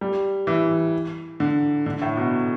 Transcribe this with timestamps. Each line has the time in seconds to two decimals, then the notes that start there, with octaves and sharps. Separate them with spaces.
0.01 G3
0.47 E3
1.40 D3
1.86 D3
2.02 A2
2.17 B2